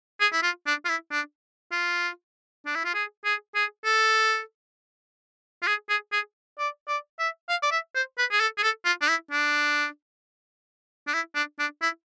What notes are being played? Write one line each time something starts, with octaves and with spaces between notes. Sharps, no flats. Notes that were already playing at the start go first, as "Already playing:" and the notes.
G#4
E4
F4
D4
F4
E4
D4
F4
D4
E4
F4
G#4
G#4
G#4
A4
F4
G#4
G#4
G#4
D5
D5
E5
F5
D5
E5
C5
B4
G#4
A4
G#4
A4
F4
D4
E4
D4
D4
E4
D4
D4
E4